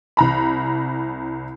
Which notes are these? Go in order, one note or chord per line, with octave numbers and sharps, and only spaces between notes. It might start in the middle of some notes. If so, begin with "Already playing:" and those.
C2 A#5 B5